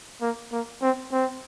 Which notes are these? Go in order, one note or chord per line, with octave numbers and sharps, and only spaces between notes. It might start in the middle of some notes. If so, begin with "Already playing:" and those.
A#3
A#3
C4
C4